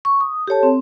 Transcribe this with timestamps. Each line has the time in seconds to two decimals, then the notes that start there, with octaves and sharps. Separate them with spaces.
0.05 C#6
0.21 D#6
0.47 G4 A4 C#5 A5
0.63 C4